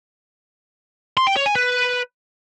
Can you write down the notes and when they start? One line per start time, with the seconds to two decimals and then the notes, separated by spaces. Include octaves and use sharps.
1.17 C6
1.27 G5
1.36 C#5
1.46 G#5
1.56 B4